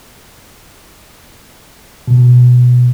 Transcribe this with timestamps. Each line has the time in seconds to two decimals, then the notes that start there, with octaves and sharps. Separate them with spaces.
2.08 B2